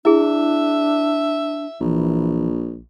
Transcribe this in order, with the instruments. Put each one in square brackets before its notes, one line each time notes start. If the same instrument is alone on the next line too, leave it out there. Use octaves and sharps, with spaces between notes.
[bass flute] D4 [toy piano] E4 G#4 [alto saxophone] E5
[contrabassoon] A#1 [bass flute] E3